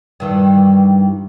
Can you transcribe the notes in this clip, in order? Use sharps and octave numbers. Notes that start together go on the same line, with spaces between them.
G2 D#3 E3